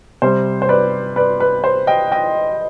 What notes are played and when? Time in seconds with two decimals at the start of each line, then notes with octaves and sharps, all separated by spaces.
0.22 C3 G3 C5
0.62 C5
0.69 B4 D5
1.16 B4 D5
1.40 B4
1.64 C5
1.87 D#5 G5
2.12 D#5 G5